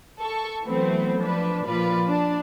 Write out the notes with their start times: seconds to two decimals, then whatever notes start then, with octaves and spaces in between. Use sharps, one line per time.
0.19 A4 C#6
0.64 E3 F#3 A3 B3 C4
1.20 F3 D4 B4
1.66 A#2 F3 F4 B4 D5
2.08 D4